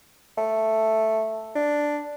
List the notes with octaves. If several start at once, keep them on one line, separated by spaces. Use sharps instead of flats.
A3
D4